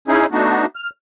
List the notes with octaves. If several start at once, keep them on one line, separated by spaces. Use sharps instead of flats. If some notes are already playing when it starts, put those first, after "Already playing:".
C#4 D#4 E4 G#4
A3 B3 D4 D#4 F#4
F6